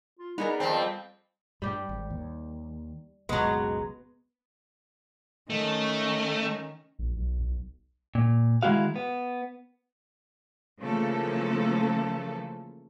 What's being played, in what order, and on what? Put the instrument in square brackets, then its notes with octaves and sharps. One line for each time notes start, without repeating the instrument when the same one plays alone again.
[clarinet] F4
[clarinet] G3 [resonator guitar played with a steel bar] B3 G#4 A#4 [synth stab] D#4
[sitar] F2 C4 [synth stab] A4 A5 B5
[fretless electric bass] G2 [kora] G3 G4
[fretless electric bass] G#1
D#2
[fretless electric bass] F#1 C#2 B2 [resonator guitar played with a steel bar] F#3 G#3 [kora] B3
[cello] D#3 C#4 [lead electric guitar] A3
[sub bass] A#1
B1
B1
[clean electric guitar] A#2
D#3 G#3 D4 E4 F#4 F5
B3
[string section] C#3 E3 F3 A3 A#3 A4